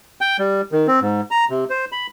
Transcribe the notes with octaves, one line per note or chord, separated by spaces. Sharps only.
G5
G3
D#3
C4
G#2
A#5
C3
C5
B5